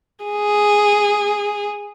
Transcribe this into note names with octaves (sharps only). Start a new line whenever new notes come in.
G#4